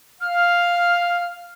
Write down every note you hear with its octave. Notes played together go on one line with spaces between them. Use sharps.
F5 F6